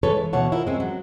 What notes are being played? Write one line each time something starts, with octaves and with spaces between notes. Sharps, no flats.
G#3 A4 B4 C#5
E3
D2 B2 E3 C#5 F#5 A5
E4 F4 A#4 C5
G#3 C4 C#4
F#3